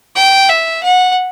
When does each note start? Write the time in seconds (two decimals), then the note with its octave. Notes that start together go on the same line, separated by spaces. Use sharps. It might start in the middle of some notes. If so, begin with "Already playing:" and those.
0.16 G5
0.49 E5
0.83 F#5